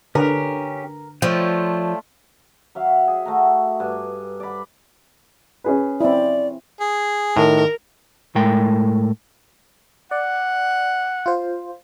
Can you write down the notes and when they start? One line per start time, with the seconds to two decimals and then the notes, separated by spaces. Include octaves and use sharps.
0.15 D3 C#4 G4 A#4 B4
1.22 F3 A3 F4 C#5 D5 G5
2.75 F#3 E5 F5
3.07 G#4
3.25 A3 F#4 A#5
3.80 G2 G#5
4.40 D5 B5
5.64 C#4 G#4 B4
6.01 C4 E4 D5
6.81 G#4
7.37 A2 D#3 A#4
8.35 A2 G#3 A3 A#4 G5
10.11 D5 F#5
11.26 F4 C5